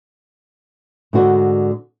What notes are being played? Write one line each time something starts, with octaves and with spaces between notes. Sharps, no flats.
G#2 D3 F#4 D5 D#5